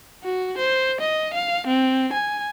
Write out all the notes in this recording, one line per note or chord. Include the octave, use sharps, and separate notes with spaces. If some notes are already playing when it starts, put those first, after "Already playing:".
F#4
C5
D#5
F5
C4
G#5